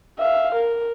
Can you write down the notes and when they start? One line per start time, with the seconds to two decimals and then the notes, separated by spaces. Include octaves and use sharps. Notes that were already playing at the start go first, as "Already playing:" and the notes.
0.19 E5 F5
0.55 A#4